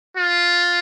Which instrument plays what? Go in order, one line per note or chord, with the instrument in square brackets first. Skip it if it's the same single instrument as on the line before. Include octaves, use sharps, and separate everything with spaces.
[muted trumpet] F4